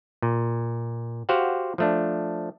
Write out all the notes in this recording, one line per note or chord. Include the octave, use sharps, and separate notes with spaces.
A#2
F#4 G4 C5 F5 F#5
F3 A3 D4